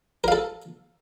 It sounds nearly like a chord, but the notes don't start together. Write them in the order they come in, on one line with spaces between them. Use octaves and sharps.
A#4 F5 A4